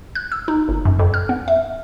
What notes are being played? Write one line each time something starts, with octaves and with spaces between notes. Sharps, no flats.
F#6
E6
D#4
G1
F#2
F2
F6
B3
E5